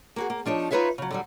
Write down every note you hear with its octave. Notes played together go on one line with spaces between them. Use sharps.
A#3 F#4 G#4
A#3
F3 D4 D#4 C#5
D#4 F4 B4 C#5 E5 F5
C#3 F#3
D3 F#3 G3